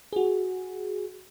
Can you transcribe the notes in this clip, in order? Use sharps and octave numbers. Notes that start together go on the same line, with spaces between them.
F#4 G#4